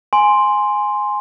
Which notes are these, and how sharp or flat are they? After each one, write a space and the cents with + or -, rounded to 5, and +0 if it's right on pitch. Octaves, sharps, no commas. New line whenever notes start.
G#5 +0 C6 +0